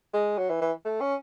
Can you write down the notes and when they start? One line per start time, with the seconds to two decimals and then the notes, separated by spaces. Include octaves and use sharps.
0.13 G#3
0.38 F#3
0.49 E3
0.61 E3
0.85 A3
1.01 C#4